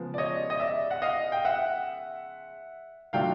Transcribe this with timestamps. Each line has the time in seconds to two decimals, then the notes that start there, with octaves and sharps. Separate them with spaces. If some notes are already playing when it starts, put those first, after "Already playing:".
Already playing: C#3 F3 G#3 B3
0.14 D5
0.18 C#5 D#5
0.50 D#5
0.60 D5 E5
0.91 F#5
1.02 D#5 F5
1.32 G5
1.45 E5 F#5
3.13 D#3 F#3 A3 D4 F4 F5 G5